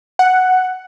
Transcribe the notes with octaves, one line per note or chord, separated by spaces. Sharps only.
F#5